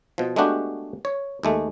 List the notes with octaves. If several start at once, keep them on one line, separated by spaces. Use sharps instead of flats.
B2 F3
G#3 A3 B3 D4 F#4 G4
C#5
D#2 G#3 A3